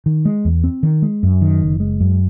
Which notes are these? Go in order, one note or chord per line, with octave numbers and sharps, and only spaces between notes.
D#3
G#3
E2
C4
D#3
G#3
F#2
D#3
F#1
G#3
F#2